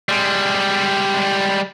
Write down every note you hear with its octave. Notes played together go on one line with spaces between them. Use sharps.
G3 G#3